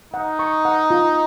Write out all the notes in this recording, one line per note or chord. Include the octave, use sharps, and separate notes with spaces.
D#4 F#5
C#6
F#5
F4